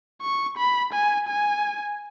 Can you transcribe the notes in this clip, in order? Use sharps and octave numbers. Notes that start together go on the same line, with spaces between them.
C#6
B5
G#5
G#5